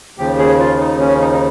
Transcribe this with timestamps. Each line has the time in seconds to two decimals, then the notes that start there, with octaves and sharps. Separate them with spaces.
0.18 D#2 C#3 F3 G4
0.39 G#4
0.59 F4
0.80 D#4
1.00 C#4
1.20 D#4
1.32 D#4